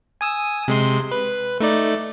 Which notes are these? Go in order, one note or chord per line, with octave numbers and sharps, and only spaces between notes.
G#5 D#6 E6
C3 G#3 C6
B4
A3 D#4 D5